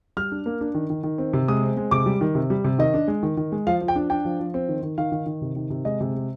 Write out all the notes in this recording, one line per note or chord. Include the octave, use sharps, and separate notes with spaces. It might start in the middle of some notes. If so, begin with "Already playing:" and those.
G3 F6
D4
A#3
D4
D#3
D#3
D#3
C4
C3
G#3 D#6
C4
G#3
C3 D6
G3
D#3
C3
G3
C3
D#3 D#5
D4
G#3
D#3
D#3
G#3
F3 F5
F3
G5
D4
D4 G5
F3
F3
C4
D#3
D#3
D#3 F5
D#3
D#3
C3
D#3
C3
G#3 D#5
C3
G#3